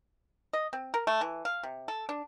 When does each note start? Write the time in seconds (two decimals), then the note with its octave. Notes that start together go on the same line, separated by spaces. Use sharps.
0.53 D#5
0.73 C4
0.94 A#4
1.07 A3
1.21 E3
1.45 F5
1.63 C3
1.88 A4
2.09 D4